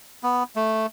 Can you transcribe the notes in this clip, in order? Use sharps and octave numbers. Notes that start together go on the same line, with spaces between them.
B3
A3